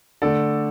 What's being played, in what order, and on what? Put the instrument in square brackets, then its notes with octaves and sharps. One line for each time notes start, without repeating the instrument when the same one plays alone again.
[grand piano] D3 A3 A4 D5